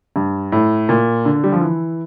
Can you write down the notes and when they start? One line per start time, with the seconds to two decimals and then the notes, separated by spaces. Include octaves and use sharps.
0.16 G2
0.52 A2
0.89 A#2
1.25 D3
1.44 G3
1.52 F3
1.61 E3